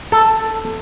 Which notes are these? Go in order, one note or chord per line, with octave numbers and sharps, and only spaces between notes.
A4